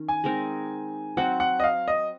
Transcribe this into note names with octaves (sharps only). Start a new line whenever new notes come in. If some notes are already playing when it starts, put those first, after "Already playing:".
Already playing: D#3 C#4
G#5
G#3 C4 D#4 A#4
F#3 C4 F#4 F#5
F#5
D#5
F5
D#5